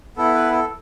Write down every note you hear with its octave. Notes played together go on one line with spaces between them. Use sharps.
B3 E4 A4
B4
A4